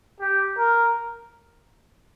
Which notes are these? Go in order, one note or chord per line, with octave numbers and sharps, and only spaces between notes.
G4
A#4